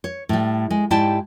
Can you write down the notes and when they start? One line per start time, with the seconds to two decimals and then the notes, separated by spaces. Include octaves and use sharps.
0.04 C#5
0.29 A2 G3
0.71 G#3
0.91 G#2 E4 G4 D5 G5 A5